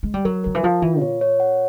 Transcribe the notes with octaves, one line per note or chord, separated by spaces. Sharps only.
G#3
G3
F#3 A#4
D#3 A#4
E3
F3 F4
E3 F4
A#2 C#5
C#5
F#5